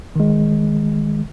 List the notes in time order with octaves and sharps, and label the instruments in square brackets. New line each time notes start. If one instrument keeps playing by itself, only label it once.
[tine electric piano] D#3 G#3